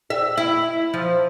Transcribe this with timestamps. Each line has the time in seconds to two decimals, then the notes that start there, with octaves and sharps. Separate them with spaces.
0.10 E5
0.37 E4
0.94 F3